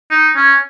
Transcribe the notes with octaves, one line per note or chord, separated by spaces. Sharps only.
D#4
C#4